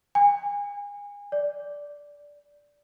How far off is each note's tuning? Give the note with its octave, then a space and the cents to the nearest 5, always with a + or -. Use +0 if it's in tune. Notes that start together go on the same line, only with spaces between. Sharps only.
G#5 -30
D5 -10